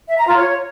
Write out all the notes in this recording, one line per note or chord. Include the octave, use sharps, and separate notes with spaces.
E5
A#5
F4
C#5